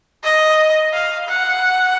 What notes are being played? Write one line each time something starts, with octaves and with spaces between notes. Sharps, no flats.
D#5
F5
F#5